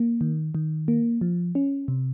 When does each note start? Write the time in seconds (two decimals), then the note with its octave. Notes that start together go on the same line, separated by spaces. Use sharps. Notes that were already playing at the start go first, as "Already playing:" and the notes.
Already playing: A#3
0.21 D#3
0.55 D#3
0.88 A#3
1.21 F3
1.55 C#4
1.88 C3